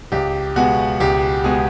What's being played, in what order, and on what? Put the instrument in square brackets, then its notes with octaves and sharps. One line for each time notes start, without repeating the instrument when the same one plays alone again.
[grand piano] C#2 G4
B2 G#3 B3 F#4
C#2 G4
B2 G#3 B3 G#4